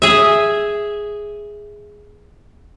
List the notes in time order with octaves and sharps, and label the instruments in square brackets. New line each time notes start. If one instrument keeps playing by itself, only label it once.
[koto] G#4 E5